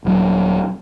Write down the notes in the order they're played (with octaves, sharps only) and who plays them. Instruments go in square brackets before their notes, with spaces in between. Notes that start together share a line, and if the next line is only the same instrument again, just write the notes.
[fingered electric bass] D#1 F#3